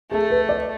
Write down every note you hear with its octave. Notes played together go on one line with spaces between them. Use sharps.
A3 G#4
B4
D5